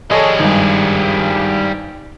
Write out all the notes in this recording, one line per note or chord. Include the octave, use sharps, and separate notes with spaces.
G3 G#4 A4 C#5 D#5
G#1 G2